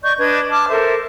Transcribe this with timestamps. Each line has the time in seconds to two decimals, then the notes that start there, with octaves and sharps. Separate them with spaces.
0.03 D5 D#5 C#6 G6
0.19 D4 B4 D#5 G#6
0.49 A5 D6 F6
0.69 A4 A#4 C5 E5